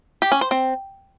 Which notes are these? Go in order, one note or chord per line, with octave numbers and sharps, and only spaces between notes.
G4
C#4
C5
C4